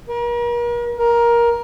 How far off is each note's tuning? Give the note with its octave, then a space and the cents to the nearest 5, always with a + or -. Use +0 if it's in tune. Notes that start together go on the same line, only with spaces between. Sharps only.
A#4 +40
A#4 +15